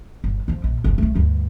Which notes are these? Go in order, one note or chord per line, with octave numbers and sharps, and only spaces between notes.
G1
F2 F3
A#1
F#1 C2
C2 A3
D2 G2